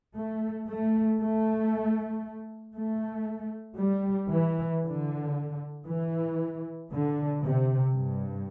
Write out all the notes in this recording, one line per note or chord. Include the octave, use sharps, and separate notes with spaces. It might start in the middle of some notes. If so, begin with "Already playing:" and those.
A3
A3
A3
A3
G3
E3
D3
E3
D3
C3
G2